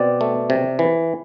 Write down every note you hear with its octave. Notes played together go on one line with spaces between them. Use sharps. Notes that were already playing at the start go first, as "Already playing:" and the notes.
Already playing: B2 C4 D5
A3
C3
E3